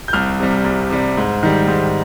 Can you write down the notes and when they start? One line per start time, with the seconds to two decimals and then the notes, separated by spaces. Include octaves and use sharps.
0.08 G6
0.13 C2 F6
0.40 C3 G3
0.64 C2
0.90 C3 G3
1.17 G#2
1.43 D#3 G3
1.67 G#2